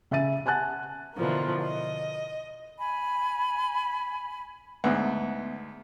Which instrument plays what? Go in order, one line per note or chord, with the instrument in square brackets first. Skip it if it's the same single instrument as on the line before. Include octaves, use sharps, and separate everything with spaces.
[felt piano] C#3 E5 G#5 A6 D#7
F#5 G#5 A5 F#6 A6
[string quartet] B2 D3 E3 F3 A#3
D#5
[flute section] G#5 B5
[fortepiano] D2 G#2 F#6 [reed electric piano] B3 E5